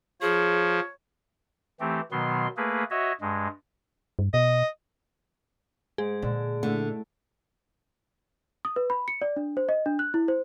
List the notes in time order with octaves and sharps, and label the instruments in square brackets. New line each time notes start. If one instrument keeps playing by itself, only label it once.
[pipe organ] F3 [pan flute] G#4 [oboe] C#5
[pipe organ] E3 A3 C4 G4
B2 D#3 F#3 B3 C6
A3 A#3 G#4 B4
F#4 C#5 D#5 E5
G2 G#3
[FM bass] G2
[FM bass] B2 [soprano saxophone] D#5
[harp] G#2 [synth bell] G#4
[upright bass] A#2 [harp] D3
[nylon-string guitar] D3 [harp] A3 E4
[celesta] D#6
B4
B5
C#7
D5
D4
C5
D#5
D4
F#6
E4
C5